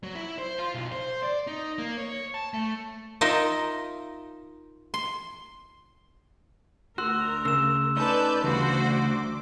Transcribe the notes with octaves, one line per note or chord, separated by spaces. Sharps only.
F#3
E4
C5
F4
B1
C5
D5
D#4
A#3
C#5
A5
A3
D#4 F4 A#4 D#5 E5
C6
D2 F#4 A#4 C6 E6 F#6
C#3 E6 E7
A3 C#4 D#4 B4 D5 A5 G6
D2 C#3 E3 G3 F#4 C5 D6